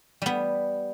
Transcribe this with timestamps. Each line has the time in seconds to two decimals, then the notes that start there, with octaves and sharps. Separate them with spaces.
0.22 G3 B3